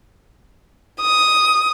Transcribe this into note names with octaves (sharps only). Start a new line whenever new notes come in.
D#6